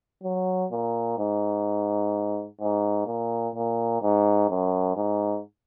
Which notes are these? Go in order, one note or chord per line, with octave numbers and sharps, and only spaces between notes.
F#3
A#2
G#2
G#2
A#2
A#2
G#2
F#2
G#2